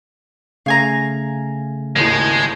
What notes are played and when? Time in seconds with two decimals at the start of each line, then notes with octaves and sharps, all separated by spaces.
0.66 C#3 A3 F5 G#5 A#5
1.96 G#1 D#2 A2 G#3